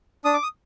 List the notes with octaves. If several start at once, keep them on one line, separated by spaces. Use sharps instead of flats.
D4 D#6
D6
D#6